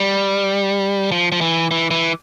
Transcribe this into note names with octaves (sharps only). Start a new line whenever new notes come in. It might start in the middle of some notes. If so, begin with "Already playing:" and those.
Already playing: G3
F3
F3
E3
E3
E3